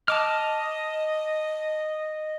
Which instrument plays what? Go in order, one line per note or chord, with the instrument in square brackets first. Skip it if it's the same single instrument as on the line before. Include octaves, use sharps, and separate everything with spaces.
[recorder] D#5 [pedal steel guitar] A5 D6 F6